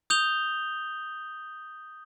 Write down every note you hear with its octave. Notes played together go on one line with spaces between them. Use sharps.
D#6 G6 F7 G7